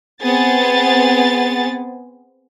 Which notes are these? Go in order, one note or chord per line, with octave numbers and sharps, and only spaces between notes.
B3 C4 G#4 A6